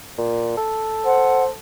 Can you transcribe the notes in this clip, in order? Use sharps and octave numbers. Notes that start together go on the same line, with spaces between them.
A#2
A4
C5 F#5